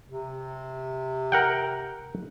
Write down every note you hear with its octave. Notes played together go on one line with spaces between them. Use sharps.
C3
A#4 F#5 G5